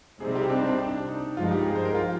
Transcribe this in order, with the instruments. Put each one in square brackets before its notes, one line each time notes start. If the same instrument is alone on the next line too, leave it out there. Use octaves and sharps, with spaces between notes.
[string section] C3 G3 C4 D#4 [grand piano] G#4
[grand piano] G4
D4
C4
D4
D#4
[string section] G2 F3 G#3 D#4 [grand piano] F4
[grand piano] G4
G#4
C5
A#4
F4